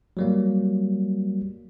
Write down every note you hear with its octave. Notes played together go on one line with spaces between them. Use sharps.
F#3 G3 A#3